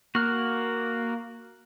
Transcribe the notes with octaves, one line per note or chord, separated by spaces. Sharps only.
A#3 F#4 F6 F#6